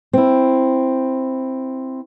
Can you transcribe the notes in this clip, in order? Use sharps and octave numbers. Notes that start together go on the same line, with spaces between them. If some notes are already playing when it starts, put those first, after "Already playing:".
C4 E4